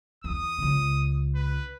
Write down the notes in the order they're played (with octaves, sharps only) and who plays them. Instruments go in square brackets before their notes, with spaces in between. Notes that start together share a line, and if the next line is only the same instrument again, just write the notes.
[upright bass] E2 [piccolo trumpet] D#6
[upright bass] C#2 C#3
[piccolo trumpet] B4